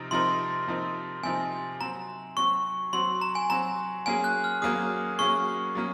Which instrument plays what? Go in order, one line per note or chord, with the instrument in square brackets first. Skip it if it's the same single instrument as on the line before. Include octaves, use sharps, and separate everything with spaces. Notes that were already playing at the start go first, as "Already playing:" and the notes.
Already playing: [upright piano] C3 F3 C4 D#4 A#4
[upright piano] C3 F3 C4 D#4 A#4 [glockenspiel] C6
[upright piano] C3 F3 C4 D#4 A#4
[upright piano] C3 F3 C4 D#4 A#4 [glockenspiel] G#5
[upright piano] F#3 C4 F#4 [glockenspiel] A#5
[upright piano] F#3 C4 F#4 [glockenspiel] C#6
[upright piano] F#3 C4 F#4 [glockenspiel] C6
[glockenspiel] A#5
G#5
[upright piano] F#3 C4 F#4 [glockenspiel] A#5
[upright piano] F#3 A#3 C#4 G#4 [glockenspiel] G#5
[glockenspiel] F#6
F6
[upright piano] F#3 A#3 C#4 G#4 [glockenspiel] D#6
[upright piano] F#3 A#3 C#4 G#4 [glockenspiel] C#6
[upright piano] F#3 A#3 C#4